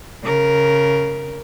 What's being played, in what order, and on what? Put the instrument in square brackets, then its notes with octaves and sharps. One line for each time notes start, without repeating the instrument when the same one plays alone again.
[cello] C#3 A#4